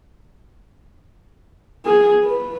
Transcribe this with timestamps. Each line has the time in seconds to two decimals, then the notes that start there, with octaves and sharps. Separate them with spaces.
1.85 G#4
2.24 B4